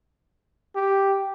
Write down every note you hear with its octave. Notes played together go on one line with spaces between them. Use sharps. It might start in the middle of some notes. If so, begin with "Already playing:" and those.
G4